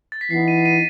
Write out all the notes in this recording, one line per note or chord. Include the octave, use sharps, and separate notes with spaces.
A6
B6
E3 B3 D#4 C7
D#7
D#7